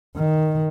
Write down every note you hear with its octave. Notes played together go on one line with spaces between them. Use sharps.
D#3